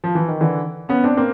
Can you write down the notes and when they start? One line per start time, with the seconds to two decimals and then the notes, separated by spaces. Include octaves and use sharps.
0.04 F3
0.15 E3
0.29 D#3
0.40 D3 E3
0.89 B3 C#4
1.04 C4 D4
1.17 A#3 C4